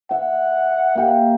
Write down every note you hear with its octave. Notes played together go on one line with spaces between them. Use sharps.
E5 F#5
A#3 G4 A#4